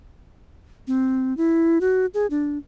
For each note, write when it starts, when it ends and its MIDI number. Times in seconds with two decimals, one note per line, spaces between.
0.87 1.36 60
1.37 1.79 64
1.81 2.06 66
2.14 2.26 68
2.30 2.58 62